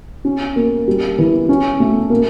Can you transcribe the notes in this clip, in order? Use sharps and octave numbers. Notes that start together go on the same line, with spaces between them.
C#4
A#3
G3
E3
C#4
A3
A#3